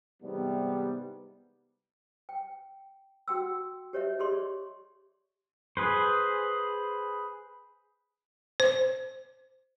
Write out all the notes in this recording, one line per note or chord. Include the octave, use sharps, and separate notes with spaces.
G#2 C3 E3 G3 B3
G5
F#4 F#5 G5 C6 E6
G4 C#5 D#5 E5
G4 G#4 D5 D#5 C6 C#6
G#4 B4 C5
C5